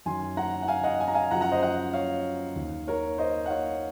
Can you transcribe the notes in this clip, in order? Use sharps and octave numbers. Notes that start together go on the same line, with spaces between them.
F#2 D#3 G#5 C6
F#5 A#5
F#5
F5 G#5
D#5 F#5
G#5
A#5
F5 G#5
F#2 C#3 F3 F#5 A#5
F#5 A#5
C5 D#5
D#5 F#5
C#5 F5
D#2 D#3
A#4 C#5
C5 D#5
F#5
C#5 F5